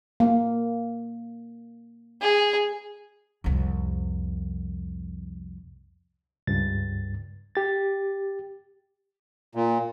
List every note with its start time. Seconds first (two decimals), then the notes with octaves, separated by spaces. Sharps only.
0.20 A#3
2.21 G#4
3.44 C2 F2
6.47 C#2 G2 A6
7.55 G4 A6
9.55 A#2